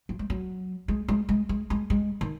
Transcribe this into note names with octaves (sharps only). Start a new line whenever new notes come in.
F#3
G#3
F#3
G#3
G#3
G#3
G#3
G#3
G#3
D#3